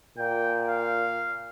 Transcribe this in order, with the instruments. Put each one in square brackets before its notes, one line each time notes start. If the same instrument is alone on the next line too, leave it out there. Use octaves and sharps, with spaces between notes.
[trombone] A#2 [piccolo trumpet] G5
[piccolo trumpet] F5